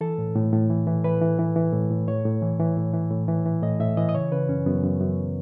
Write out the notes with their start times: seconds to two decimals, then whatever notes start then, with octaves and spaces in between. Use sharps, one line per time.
0.01 E3 A4
0.18 A2
0.35 A2
0.52 A2
0.70 E3
0.87 E3
1.04 E3 B4
1.22 E3
1.39 E3
1.56 E3
1.73 A2
1.90 A2
2.08 A2 C#5
2.25 A2
2.42 E3
2.60 E3
2.77 A2
2.94 E3
3.11 A2
3.28 E3
3.46 E3
3.63 A2 D#5
3.80 A2 E5
3.97 E3 D#5
4.09 D#5
4.14 C#3 C#5
4.32 C#3 B4
4.49 F#2 C#4
4.66 F#2 B3
4.84 F#2
5.01 F#2